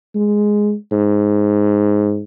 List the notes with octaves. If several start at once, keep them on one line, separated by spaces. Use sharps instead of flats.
G#3
G#2